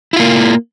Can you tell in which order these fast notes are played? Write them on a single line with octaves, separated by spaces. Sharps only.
E4 F4 A#3